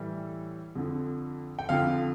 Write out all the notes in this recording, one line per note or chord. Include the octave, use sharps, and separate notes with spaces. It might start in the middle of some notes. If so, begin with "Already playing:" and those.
Already playing: A2 E3 G3
F2 D3 F3
G5
F2 D3 F3 F5